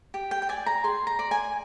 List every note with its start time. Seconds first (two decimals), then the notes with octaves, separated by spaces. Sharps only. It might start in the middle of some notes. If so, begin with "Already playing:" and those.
0.14 G4
0.31 G5
0.42 G5
0.49 D5 G#5
0.66 A#5
0.84 G#4 C6
1.07 A#5
1.19 D5
1.31 G#5